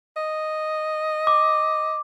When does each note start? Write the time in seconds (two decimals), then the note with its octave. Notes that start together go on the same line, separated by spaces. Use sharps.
0.16 D#5
1.27 D6